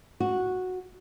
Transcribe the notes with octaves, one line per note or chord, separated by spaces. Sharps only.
F#4